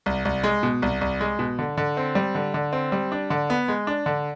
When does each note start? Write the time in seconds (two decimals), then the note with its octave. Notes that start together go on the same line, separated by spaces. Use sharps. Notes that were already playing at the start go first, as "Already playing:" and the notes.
0.06 C2
0.25 C2
0.44 G#3
0.63 B2
0.82 C2
1.01 C2
1.21 G#3
1.39 B2
1.59 D3
1.77 D3
1.97 C4
2.15 G3
2.35 D3
2.54 D3
2.73 C4
2.92 G3
3.12 D4
3.30 D3
3.50 B3
3.68 G#3
3.87 D4
4.06 D3